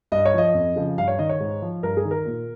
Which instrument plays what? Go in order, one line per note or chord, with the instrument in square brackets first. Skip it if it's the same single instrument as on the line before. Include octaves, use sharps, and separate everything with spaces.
[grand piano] G2 D#5
C#5
F3 D#5
F2
C#3 F3
G2 F5
C#5
D#3 D#5
C#5
G#2
F3
G2 A#4
G#4
D#3
A#4
A#2